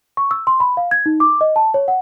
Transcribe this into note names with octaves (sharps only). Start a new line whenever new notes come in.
C#6
E6
C6
B5
F5
G#6
D#4
D6
D#5
A5
C#5
F#5